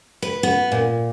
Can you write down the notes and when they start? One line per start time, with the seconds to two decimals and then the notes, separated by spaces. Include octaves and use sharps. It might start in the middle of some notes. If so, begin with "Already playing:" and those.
0.22 B4
0.43 B3
0.72 A#2